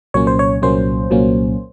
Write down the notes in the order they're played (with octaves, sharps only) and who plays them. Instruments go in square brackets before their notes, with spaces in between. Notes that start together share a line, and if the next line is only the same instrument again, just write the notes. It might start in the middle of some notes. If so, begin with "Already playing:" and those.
[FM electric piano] C2 A#2 F#3 A#3 C#4 C#5
C5
C#5
C2 A#2 F#3 A#3 C#4 C5
C2 A#2 F#3 A#3 C#4